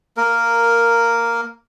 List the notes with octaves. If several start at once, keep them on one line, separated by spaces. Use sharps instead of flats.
A#3 A#4